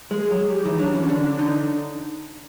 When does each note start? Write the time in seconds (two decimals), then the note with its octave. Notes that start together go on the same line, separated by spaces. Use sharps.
0.11 G#3
0.20 G#4
0.31 F#3
0.50 G4
0.65 E3 D#4
0.79 F#3 D4
0.94 E3 C#4
1.09 D3 D4
1.39 D3 D#4